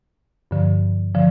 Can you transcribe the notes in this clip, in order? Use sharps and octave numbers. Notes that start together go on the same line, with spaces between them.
G2 D3 F3
D3 F3